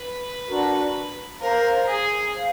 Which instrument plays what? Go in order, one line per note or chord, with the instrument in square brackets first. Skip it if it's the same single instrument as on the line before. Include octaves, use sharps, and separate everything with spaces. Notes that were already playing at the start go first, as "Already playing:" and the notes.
Already playing: [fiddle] B4
[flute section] D4 F#4 A#4
[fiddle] A#4 [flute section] C5 F5 A#5
[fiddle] G#4
[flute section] C5 F5